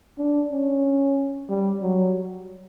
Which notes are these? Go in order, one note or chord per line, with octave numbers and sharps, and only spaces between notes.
D4
C#4
G3
F#3